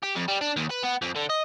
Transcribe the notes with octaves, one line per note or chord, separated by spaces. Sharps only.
G4
F2
G3
D4
D#2
B4
B3
F2
D3
D#5